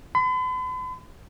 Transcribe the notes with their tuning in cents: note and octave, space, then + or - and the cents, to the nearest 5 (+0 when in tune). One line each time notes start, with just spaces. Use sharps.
B5 +45